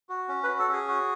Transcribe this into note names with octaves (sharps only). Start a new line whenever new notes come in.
F#4
C#4
F#4 B4
A4
C#4 G#4
F#4